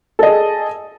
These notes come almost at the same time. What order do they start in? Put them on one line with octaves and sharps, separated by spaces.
A4 D#5 G#4